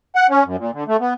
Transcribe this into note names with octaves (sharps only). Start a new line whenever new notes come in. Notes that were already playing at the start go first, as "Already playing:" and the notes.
F#5
C#4
F#2
A#2
D3
A3
B3